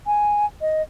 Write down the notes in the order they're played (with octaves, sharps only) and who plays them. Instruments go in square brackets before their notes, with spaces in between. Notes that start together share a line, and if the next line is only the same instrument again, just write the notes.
[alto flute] G#5
D#5